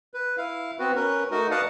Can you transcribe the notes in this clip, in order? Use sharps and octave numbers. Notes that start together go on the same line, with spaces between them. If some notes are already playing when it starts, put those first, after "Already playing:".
B4
E4 F5
B3 C4 F#4 B4
C#4 A#4 B4
A3 D#4 F#4 A#4
B4 D5 D#5 F5 F#5 A5